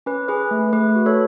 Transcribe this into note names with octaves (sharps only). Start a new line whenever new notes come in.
C#4 B4
G#4 B4
A3
A3 B4
F#4
A4 C#5